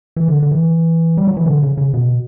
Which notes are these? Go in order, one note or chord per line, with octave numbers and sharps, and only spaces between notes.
E3
D3
D3
E3
G3
F#3
E3
D3
C#3
C#3
B2